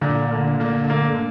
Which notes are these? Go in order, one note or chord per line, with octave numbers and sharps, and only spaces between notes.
A#2 D3
A#3
D3 A#3
A#3